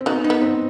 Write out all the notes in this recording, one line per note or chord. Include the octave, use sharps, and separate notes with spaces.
C4
B3 D#4 F#4
D#4
B3
C4